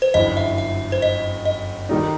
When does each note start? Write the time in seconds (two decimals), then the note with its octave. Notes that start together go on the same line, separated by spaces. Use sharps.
0.02 C5
0.14 G1 F#2 E3 D#5
0.37 E5
0.58 E5
0.92 C5
1.02 D#5
1.45 D#5
1.89 D#3 G3 D#4